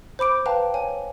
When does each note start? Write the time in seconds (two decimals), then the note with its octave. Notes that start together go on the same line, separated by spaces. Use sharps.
0.19 C5 B5 D6 D7
0.46 B4 F5 G5 A5 A#5
0.74 C#5 G#5